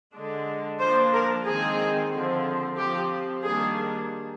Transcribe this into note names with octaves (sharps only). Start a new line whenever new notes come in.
D3 G#3 D4
F3 A#3 D4 C5
A#4
D#3 G#3 C4 G#4
D3 F3 C4
F3 C4 G4
D#3 G3 A#3 D4 G#4